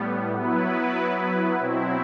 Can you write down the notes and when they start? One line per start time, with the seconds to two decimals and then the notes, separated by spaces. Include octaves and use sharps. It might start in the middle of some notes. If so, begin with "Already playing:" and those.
Already playing: A2 G3 B3
0.36 F#3 B3 E4 B4
1.59 B2 F#3 C4 E4